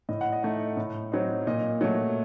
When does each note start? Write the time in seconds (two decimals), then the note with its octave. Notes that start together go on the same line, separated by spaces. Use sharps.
0.09 A2 D#5
0.21 F#5
0.32 D#5
0.43 A3 D#4
0.77 A2
1.12 F#3 C4 D#4
1.47 A#2 D#5
1.81 F#3 A3